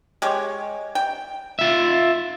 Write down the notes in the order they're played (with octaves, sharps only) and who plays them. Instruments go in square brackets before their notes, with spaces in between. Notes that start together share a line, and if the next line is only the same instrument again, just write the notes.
[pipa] G#3 G4 C#5
G5
[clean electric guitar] F4 E5